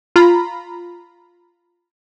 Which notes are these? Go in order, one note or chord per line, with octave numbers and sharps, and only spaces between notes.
F4 A#5 B5